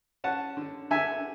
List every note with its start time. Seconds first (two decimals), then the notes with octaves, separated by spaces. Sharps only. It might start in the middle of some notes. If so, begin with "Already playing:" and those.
0.24 C#4 F#5 A5
0.57 D3
0.91 D3 E5 G#5